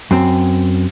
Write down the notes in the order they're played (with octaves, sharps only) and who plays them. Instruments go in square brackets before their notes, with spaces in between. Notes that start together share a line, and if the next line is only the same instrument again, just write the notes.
[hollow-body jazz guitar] F#2 C4